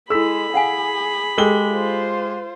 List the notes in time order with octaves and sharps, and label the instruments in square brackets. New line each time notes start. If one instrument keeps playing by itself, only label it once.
[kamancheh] G#3 [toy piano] E4 A4 [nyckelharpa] B5 [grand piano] E6 B6
[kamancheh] G#4 [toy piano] F5 F#5 G#5
[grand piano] G#3 G4 G7 [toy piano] A4 A#4
[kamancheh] F4 C5